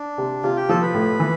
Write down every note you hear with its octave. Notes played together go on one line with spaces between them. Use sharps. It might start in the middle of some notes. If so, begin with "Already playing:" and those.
Already playing: D4
C3
C3 F4
G4
F3 A4
B4
A2
E3